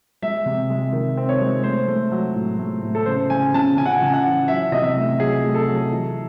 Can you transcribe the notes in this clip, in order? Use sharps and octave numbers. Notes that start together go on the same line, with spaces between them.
G#3 E5
C3
G#3
D#3
C4
C#5
G#3
A3 C5
A3
F#3
A2
A3
A2
A4
C#3 C5
C#3 G#5
C#3 A5
C#3 G#5
F#5
G#5
C#3
F#5
E3
F#3 E5
C3 D#5
E5
A3
F#3 G#4
A3
A4
F#3
E3